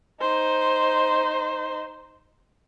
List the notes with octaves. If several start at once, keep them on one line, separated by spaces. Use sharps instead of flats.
D#4 C5